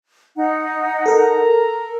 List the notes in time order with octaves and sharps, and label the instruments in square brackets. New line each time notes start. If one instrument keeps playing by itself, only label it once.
[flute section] D#4 F#5
[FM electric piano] A4 A#4 [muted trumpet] A#5